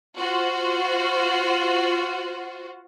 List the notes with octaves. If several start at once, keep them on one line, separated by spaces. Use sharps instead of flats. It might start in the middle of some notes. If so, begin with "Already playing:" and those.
F4 F#4 C5